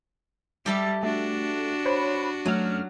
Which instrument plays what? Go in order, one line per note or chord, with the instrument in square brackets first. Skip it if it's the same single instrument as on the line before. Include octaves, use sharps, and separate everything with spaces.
[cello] G3 [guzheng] G4 A4 E5
[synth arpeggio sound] A3 [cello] D4 F#4
[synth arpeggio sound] C5 C#5 B5
[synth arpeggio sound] F#2 A3 F6 [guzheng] F#3